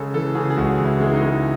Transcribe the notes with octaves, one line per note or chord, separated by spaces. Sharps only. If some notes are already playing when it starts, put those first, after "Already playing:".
Already playing: C#3 G#3 A4
E3 A4
C#3 G#4
G#4
C#2 F#4
E3
E4
G#3 E4
D#4
G#3